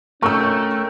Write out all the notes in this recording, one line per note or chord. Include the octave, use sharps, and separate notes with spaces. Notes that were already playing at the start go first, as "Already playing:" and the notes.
A3 C#4 A#4 G5 C#6 E6